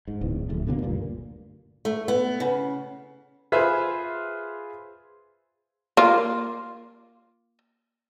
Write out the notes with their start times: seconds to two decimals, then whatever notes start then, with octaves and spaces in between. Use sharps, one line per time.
0.08 G#2
0.21 D1 B1 E2
0.49 D1 A#1 A3
0.67 B2 D3 F#3 A#3
0.82 F#1 D2 G2 A#2
1.85 A3
2.08 B3
2.40 C#3
3.52 F4 G#4 B4 C5 E5
5.97 A#3 F4